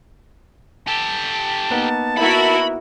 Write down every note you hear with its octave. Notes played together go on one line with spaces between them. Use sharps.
G4 A4 A5
A#3 B3 D#4
E4 F#4 A#4 B5